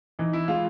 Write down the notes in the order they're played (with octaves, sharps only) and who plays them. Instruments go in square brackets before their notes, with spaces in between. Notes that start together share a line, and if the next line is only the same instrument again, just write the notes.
[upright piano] E3 [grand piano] D#4
[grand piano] E4
[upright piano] G#3 [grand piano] F4